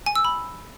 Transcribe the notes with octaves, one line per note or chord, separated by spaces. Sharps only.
G#5
E6
B5